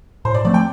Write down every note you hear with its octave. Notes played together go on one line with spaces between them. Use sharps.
A2 C5
D5
F3 A3 C4 D5
G5